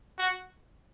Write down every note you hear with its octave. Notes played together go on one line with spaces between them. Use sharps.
F#4